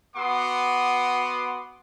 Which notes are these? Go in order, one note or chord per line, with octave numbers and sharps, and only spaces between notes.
B3 F#4 F#5 C6 D6 D#6